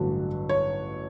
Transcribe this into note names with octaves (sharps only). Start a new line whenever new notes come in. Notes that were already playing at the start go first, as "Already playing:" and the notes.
Already playing: A1 G2 D3 F#3
C#5